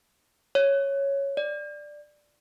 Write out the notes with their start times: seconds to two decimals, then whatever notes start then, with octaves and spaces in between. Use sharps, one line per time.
0.55 C#5
1.37 D5